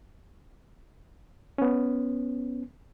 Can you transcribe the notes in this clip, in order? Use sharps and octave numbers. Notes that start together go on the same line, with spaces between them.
B3 C#4